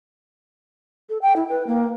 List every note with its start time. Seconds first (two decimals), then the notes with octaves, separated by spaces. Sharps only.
1.09 A4
1.22 G5
1.36 E4
1.49 B4
1.67 A#3